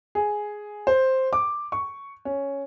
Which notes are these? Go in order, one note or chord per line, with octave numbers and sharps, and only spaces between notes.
G#4
C5
D6
C#6
C#4